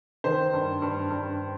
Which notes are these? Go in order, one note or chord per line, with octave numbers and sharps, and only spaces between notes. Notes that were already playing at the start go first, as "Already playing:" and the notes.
D#3 C5
G2
G2
G2